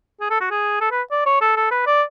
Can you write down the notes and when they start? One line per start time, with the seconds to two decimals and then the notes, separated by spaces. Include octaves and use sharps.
0.20 G#4
0.30 A4
0.41 F#4
0.51 G#4
0.81 A4
0.91 B4
1.11 D5
1.26 C#5
1.41 A4
1.56 A4
1.71 B4
1.87 D5